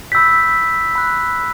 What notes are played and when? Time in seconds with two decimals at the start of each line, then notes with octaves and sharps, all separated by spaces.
0.12 B5 E6 G6 B6
0.95 B5 F#6